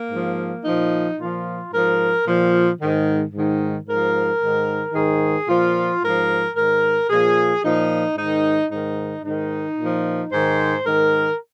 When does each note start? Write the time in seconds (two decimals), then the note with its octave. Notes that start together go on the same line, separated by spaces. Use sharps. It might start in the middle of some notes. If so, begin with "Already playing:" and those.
Already playing: A#3
0.10 G#2 F3
0.64 A#2 F3 D#4
1.18 A#2 F3 F4
1.72 G#2 F3 A#4
2.26 A#2 F3
2.80 G#2 D#3
3.33 G#2 D#3
3.87 G#2 F3 A#4
4.40 G#2 D#3
4.94 G#2 D#3 G#4
5.47 A#2 F3 F4
6.02 G#2 F3 A#4
6.55 G#2 D#3 A#4
7.09 A#2 F3 G#4
7.62 A#2 F3 D#4
8.16 G#2 D#3 D#4
8.70 G#2 D#3 D#4
9.24 G#2 D#3 D#4
9.78 A#2 F3
10.31 G#2 D#3 C5
10.84 G#2 D#3 A#4